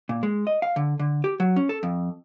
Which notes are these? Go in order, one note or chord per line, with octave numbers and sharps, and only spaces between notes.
A#2
G#3
D#5
F5
D3
D3
G4
F#3
C#4
A4
F2